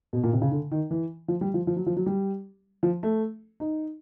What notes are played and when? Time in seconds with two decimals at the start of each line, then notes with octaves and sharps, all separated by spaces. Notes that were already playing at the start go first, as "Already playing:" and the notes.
0.13 B2
0.24 A#2
0.33 C3
0.42 C#3
0.51 D3
0.71 D#3
0.91 E3
1.28 F3
1.41 G3
1.54 F3
1.67 F3
1.77 F#3
1.86 F3
1.97 F#3
2.06 G3
2.83 F3
3.03 A3
3.60 D#4